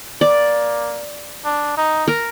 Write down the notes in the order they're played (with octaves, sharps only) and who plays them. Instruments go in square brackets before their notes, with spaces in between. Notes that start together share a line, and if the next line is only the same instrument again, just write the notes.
[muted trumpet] A#3 [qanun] D5
[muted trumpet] D4
D#4
[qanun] A#4